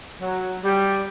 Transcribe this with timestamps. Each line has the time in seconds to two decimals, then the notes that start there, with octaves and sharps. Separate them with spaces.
0.22 F#3
0.64 G3